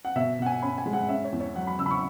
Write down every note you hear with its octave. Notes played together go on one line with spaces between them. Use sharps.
F#5
B2 E5
B2 F#5
G#5
C#4 B5
G#5
G#3
F#5
C#4 E5
C#5
E2
C#5
F#3 F#5
B5
C#3 E6
B5
C#6